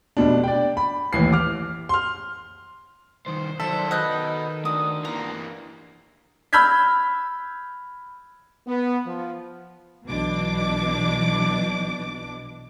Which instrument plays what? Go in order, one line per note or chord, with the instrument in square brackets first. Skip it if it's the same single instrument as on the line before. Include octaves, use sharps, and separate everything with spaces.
[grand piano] F1 B2 D4
D5 G5
B5
A1 D#2 E3 C7
D6 F6
C6 F6
[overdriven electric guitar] C2 D#3 [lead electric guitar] C5
[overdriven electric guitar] D#3 F#3 [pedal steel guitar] A4 [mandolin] D5 E5
[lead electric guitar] F#4 B4 [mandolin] D#5 F#6 G6
[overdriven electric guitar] D#3
[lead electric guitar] D4 F#4 [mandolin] D#6
[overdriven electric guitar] E3 A#3 [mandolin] A#5
[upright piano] B5 E6 F6 G6 G#6 B6
[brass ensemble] B3
F3
[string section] B1 B2 E3 D4 D6